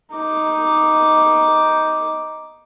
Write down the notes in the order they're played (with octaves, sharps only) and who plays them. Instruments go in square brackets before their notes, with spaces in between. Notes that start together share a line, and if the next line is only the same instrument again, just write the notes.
[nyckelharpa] D#4 D6